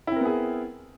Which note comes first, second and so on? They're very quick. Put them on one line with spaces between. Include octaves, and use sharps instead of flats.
E4 C4 A#4 B3 G#4